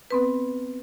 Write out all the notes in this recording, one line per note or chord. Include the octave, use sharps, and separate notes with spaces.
B3 C4 B4